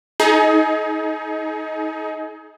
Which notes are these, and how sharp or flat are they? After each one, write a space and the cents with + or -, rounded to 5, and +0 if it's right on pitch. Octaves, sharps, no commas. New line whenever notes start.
D#4 +20 G#4 +35